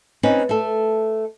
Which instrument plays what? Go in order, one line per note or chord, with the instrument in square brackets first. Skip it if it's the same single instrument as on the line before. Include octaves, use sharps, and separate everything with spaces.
[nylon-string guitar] C4 C#4 D#4 B4
A3 A4